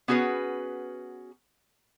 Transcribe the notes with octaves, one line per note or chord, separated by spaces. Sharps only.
B3 C#4 F#4 G#4 B4